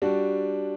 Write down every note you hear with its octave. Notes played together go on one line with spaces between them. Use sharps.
G3 D4 F#4